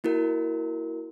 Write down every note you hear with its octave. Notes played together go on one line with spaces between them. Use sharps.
A#3 E4 F#4 A#4